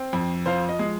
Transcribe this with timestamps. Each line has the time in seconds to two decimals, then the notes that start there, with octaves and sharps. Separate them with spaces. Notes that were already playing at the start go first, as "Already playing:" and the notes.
Already playing: C4
0.13 F2
0.46 F3 C5 F5
0.69 D#5
0.79 G#3